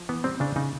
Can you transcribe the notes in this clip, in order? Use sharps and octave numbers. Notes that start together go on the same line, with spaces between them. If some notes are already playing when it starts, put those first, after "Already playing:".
Already playing: F3
E3 B3
G3 C4
C#3 D4
C#3 D#4